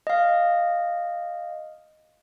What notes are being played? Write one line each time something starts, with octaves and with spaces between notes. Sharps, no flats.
D#5 F5